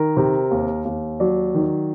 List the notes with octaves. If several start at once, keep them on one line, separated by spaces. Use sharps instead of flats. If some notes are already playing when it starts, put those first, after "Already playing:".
Already playing: D#3 A#4
C3
D#2
D#2
F#3 D5
D#3